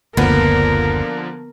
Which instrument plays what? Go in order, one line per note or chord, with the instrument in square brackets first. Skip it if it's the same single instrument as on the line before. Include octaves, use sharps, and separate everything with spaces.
[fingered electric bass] F#1 D2 [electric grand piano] D3 F3 A#3 [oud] B3 [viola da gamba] A#4